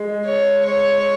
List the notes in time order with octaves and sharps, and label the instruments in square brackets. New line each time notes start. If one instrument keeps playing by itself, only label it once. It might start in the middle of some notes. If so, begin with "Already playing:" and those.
Already playing: [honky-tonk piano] G#3
[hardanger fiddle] C#5
C#5